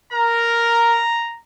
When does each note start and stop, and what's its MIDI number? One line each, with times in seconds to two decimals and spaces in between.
0.13 1.02 70
0.13 1.39 82